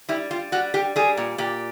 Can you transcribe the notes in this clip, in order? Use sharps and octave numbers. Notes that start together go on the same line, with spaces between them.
G3 E4
G3 F4
G3 F#4
G3 G4
G3 G#4
A#2
A#2 G4